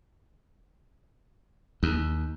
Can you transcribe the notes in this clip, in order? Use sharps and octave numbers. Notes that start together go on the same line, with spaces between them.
D#2